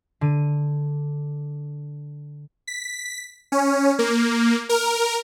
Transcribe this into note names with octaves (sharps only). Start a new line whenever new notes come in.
D3 D#7
B6
C#4
A#3
A#4